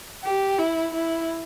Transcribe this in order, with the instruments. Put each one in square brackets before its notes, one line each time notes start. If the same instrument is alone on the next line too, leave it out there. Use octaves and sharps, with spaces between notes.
[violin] G4
E4
E4